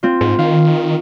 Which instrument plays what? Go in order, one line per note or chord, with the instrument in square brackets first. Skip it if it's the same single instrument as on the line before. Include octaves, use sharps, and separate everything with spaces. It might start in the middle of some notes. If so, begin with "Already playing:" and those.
[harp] C4 F4
[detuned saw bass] G#2
[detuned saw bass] D#3 [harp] F5